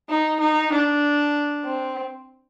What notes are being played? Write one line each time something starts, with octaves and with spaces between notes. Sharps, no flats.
D#4
D#4
D4
C4